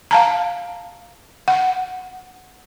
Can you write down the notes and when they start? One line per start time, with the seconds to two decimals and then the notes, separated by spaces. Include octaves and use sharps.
0.11 F5 A5 A#5
1.48 F#5